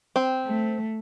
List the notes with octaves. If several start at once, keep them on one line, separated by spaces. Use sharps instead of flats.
C4
A3